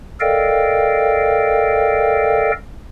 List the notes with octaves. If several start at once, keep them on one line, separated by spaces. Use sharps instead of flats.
A4 A#4 D5 D#5 F5 G5